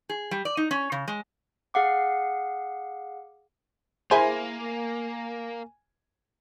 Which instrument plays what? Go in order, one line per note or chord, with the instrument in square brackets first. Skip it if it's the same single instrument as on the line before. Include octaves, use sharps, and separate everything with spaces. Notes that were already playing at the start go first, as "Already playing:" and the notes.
[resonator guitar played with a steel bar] G#4
G3
D5
D#4
C#4
C#3
G#3
[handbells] G#4 F5 F#5 D6
[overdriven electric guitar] A#3 [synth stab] E4 G#4 C5 [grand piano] G#5